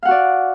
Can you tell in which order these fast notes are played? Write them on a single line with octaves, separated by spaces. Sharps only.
F5 F#5 F#4 D5